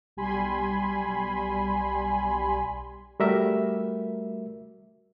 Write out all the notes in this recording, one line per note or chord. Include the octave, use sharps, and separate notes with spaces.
B1 G3 G#5 B5 C6
G3 A3 F#4 A#4 E5